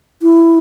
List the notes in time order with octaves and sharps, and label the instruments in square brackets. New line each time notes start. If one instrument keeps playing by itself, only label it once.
[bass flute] E4